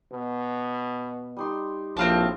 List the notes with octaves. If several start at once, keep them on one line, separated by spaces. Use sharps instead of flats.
B2
G3 D#4 C6
A#1 A2 C4 F4 A5